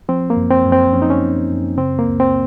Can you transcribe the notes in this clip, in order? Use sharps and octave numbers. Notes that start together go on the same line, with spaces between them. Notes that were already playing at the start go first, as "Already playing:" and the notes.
F3 C4
A#3
F#2
C4
F#2
C4
F3 C#4
D#4
C#4
F3
F#2
C#3 C4
A#3
C#2
C4